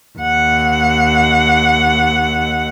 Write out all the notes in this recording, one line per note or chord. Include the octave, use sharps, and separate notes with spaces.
D#2 F#5